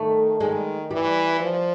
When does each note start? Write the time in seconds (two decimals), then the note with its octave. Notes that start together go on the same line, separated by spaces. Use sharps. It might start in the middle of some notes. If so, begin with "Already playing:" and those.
Already playing: D#3 A3
0.40 D#3 G#3
0.91 E3 G3
1.40 F3